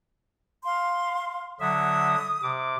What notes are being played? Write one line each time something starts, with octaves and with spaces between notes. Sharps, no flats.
F5 C6
D3 F#3 E5 D#6
C3 D6